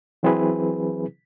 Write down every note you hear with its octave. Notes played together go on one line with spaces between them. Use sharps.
E3 F#3 C4 E4 G#4 B4